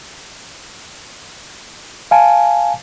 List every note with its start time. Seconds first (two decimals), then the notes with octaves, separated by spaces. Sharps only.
2.11 F5 G#5 A5